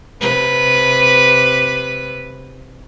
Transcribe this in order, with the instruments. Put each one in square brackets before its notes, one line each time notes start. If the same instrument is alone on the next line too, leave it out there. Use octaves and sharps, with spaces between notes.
[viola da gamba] C3 B4